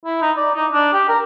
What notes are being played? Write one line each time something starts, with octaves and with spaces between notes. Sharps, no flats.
E4
D#4
D5
D#4
D4
G4
A#4